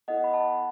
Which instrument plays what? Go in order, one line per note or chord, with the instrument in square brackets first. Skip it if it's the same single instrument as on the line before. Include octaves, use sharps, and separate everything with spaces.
[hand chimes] B3 E4 A4 D#5 F#5
B5
F#5 A5